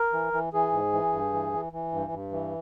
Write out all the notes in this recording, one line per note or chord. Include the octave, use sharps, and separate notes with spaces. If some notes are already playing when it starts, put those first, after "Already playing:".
Already playing: A#4
E3
E3
E3 G#4
G#2
E3
G2
E3
E3
E3
G2
G2
E3